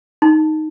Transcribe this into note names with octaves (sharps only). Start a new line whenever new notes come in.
D#4